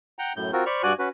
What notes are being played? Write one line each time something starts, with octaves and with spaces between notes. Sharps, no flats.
F#5 G5 A#5
F#2 A2 G6
C4 F4 F#4 A#4
C5 D5 B5 C#6 F6
G2 F#4 D5 G#5 F#6
C#4 F#4 B4